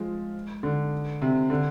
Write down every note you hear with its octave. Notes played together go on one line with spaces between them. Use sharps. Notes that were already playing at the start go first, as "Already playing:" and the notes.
Already playing: F3 G#3
D3
C3
D3